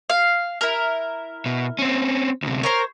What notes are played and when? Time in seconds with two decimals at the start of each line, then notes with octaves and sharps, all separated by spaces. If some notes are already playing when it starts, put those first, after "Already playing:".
0.10 F5
0.61 E4 A#4
1.46 B2
1.79 C4 C#4
2.42 D2 C3
2.63 A#4 C5 C#5